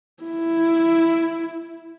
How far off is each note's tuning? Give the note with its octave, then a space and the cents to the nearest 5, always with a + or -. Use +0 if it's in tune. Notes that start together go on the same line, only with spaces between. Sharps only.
E4 +5